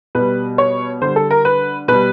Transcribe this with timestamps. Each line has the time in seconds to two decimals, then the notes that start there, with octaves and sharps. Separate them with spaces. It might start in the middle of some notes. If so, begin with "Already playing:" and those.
0.15 B2 G3 B4
0.58 C#5
1.02 D3 G3 C5
1.16 A4
1.31 A#4
1.45 B4
1.88 B2 G3 B4